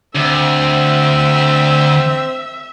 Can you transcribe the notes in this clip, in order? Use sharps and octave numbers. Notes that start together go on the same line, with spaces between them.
D2 C4 E5